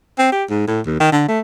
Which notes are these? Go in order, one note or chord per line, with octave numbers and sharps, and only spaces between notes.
C4
G4
G#2
A2
D#2
D#3
D3
A3